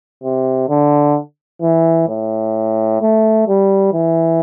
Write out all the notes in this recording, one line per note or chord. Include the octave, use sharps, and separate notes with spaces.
C3
D3
E3
A2
A3
G3
E3